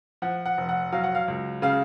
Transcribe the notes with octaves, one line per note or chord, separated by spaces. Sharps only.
F3 F#5
F#5
F1
F#5
F#3 F5
F#5
F5
C#2
C#3 F5